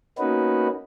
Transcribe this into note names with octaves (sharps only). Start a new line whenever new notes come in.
A#3 B3 C#4 D#4 F#4 B4